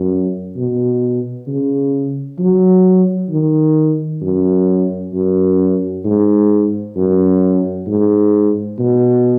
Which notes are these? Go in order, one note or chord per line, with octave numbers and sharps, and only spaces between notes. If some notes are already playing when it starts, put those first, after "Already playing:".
Already playing: F#2
B2
C#3
F#3
D#3
F#2
F#2
G#2
F#2
G#2
B2